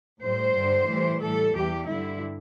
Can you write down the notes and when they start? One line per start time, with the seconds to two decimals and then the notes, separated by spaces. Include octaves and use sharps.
0.22 A2 G3 C5
0.55 G2 D3 G3
0.88 A2 E3 G3
1.22 A2 E3 G3 A4
1.55 E2 E3 G3 G4
1.88 G2 D3 G3 E4